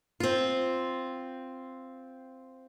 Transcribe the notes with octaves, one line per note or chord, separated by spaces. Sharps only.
C4 F4